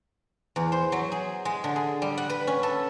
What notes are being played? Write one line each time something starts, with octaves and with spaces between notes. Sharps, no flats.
E2
C5
F#3
G#4
G#3
D3
G#4
G3
F#5
B4
C#4
A4